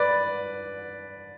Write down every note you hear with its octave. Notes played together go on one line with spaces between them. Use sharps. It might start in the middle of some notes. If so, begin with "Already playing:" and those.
Already playing: B4 D5